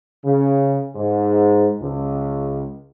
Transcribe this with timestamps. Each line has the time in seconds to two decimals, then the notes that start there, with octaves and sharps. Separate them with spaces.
0.24 C#3
0.96 G#2
1.80 C#2